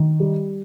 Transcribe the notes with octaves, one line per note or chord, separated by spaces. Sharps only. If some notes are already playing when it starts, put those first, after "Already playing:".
Already playing: D#3
G3